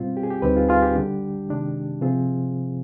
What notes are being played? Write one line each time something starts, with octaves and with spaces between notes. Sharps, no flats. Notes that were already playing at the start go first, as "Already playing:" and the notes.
Already playing: B2 G3 C4 F4
G4
G#4
G4
D2 D3 G3 C4 D#4 G4 B4
F4 G#4
F4 G#4
G4
D3 G3 D4
C3 D#3 G#3 D4
C3 F3 C4 F4 G#4